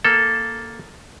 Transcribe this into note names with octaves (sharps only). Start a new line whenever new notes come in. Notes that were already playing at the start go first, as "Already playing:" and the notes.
A#3 A4